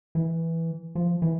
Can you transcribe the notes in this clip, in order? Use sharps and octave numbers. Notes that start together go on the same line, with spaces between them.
E3
F3
E3